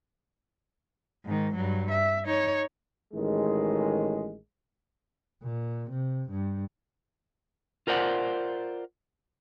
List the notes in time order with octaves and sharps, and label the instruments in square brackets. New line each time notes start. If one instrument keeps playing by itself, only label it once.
[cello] G#2 D#3
G2 F#3
E5
D#4 C#5
[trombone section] A1 D#3 G#3
[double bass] A#2
C3
G2
[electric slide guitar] F4 A#4 C5 D5 F#5